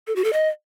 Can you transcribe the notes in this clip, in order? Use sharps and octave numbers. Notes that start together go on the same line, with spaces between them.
A4
F#4
A4
D#5